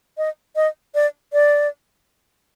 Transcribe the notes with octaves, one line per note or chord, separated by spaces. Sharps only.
D#5
D#5
D5
D5